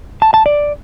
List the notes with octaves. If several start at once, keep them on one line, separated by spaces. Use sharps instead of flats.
A5
A5
D5